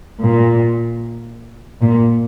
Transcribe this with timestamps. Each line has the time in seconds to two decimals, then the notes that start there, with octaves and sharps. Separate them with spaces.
0.22 A#2
1.81 A#2